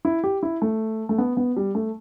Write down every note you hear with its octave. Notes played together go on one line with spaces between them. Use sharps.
E4
G4
E4
A3
A3
B3
B3
G3
A3